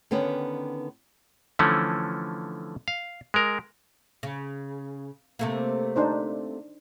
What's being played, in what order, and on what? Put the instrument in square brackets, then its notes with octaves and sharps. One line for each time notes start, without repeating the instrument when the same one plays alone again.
[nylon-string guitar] D3 D#3 B3 C#4 G4 B4
[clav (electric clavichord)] D3 E3 F3 A3 C#4
F5
G#3 A#4
[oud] C#3
C3 A3 A#3
[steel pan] D4 D#4 C5